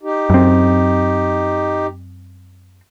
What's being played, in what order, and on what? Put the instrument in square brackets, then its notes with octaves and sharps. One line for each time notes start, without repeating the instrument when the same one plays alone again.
[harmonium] D#4 G4
[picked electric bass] F#2 C4